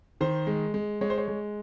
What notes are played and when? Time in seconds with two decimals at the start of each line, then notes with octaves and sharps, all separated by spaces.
0.21 D#3 C5
0.47 G#3
0.74 G#3
1.01 G#3 C#5
1.10 C5
1.18 C#5
1.28 G#3